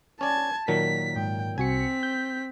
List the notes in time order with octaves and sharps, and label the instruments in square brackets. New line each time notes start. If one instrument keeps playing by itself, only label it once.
[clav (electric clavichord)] C#4 D5 [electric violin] A5 G#6
[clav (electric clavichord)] A#2 D#3 F#3 [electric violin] B6
[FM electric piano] G#2 [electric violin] G5
[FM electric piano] C2 F#4 C#7 [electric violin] C4 B6 [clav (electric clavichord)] G#5
[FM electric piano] G6